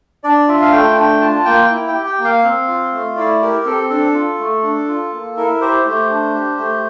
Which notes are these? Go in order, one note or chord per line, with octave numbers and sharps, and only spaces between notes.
D4 D5
F4 E5
F5
A3 G5
D4 G5
F4 A5
A#3 G5
E4
G5
G4
G5
A#3
F5
C4
F4
A3
E4 D5
G4 A#4
C4 A4
D4 A4
F4
A3
D4
F4
A#3
E4 A#4
G4 C5
A3 C5
D4
G4
A3